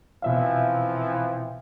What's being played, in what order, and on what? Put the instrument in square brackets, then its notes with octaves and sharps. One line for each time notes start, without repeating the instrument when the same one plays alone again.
[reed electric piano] B2 E5 F5 [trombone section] E3 F3 C4